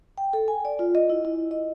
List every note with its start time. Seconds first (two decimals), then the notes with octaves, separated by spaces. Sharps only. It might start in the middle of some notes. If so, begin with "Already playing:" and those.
0.18 G5
0.33 A4
0.48 G#5
0.65 D5
0.79 F4
0.95 D#5
1.10 E4
1.25 E4
1.51 D#5